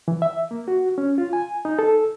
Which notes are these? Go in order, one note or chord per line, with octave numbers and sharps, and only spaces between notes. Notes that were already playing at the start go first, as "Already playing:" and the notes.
E3
E5
A#3
F#4
C#4
F4
G#5
D#4
A4